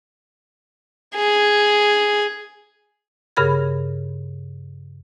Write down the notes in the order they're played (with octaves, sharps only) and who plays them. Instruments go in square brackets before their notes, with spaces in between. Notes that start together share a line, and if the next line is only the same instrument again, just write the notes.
[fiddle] G#4
[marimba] G2 C#3 G#4 A#4 B5 G#6